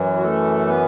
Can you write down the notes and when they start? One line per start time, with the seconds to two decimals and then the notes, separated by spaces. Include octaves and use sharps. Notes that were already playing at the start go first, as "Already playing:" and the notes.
Already playing: F#2 E3 F#3
0.17 F#4
0.23 A3 A4
0.68 B3 B4